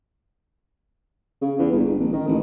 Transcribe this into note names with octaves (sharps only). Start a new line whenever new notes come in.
C#3
E2
G1
G1
A1
D#3
A1